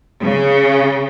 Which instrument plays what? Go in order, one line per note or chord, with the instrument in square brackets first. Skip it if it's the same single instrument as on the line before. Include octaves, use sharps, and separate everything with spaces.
[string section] C#3